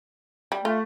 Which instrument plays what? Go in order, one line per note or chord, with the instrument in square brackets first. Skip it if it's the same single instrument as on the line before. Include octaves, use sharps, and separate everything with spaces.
[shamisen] G3
[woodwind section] A3 [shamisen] F4